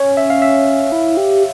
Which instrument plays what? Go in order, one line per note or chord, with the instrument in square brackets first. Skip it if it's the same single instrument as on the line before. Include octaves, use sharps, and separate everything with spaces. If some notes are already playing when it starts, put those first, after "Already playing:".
Already playing: [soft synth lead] C#4 [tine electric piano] C#5
[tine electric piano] E5
F5
E5
[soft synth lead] E4
G4